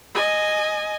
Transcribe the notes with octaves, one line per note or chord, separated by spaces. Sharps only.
D#5 G#5